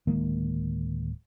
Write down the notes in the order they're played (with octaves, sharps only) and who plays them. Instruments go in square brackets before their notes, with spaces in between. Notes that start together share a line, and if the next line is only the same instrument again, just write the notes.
[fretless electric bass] D1 D#3 G#3 A#3